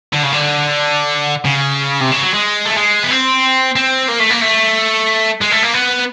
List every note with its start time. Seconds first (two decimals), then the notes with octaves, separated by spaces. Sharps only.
0.13 D3
0.23 C#3
0.33 D3
1.45 C#3
2.01 C3
2.11 C#3
2.22 F#3
2.33 G#3
2.65 A3
2.77 G#3
3.03 B3
3.10 C4
3.76 C4
4.08 A#3
4.20 A3
4.31 A#3
4.42 A3
5.41 G#3
5.51 A3
5.63 A#3
5.74 B3